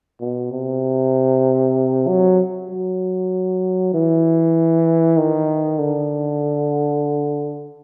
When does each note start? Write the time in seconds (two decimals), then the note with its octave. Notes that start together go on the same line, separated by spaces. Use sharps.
0.21 B2
0.52 C3
2.08 F#3
2.70 F#3
3.94 E3
5.17 D#3
5.79 D3